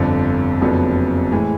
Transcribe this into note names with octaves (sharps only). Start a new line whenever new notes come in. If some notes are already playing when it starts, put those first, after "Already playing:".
Already playing: G1 F2 D3
F#1 F2 D3 F#3 B3
A2 E3 G#3